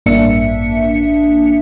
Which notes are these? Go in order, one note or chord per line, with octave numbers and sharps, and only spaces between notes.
A1 G2 A#3 D4 E5 C#7